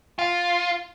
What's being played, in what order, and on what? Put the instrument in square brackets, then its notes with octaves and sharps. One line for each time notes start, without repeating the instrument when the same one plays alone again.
[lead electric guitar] F4